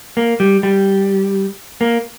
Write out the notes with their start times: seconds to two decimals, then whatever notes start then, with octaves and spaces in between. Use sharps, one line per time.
0.17 A#3
0.40 G3
0.63 G3
1.81 A#3